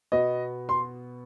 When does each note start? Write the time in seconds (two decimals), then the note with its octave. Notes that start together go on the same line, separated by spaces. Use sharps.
0.12 B2 B3 D#5
0.69 C6